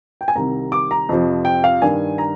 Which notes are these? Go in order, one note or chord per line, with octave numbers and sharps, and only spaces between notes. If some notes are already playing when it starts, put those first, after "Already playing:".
G5
G#5
C2 C3 D#3 A#5
D6
A#5
F2 C3 F3
G5
F5
G2 D#3 G#5
A#5